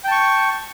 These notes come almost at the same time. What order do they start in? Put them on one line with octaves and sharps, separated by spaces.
G5 A5 C#6